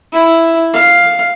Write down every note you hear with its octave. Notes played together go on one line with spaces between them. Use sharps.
E4
F5